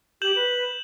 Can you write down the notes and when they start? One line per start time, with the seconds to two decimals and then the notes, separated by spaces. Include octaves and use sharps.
0.22 G4 G6 E7 F#7
0.36 B4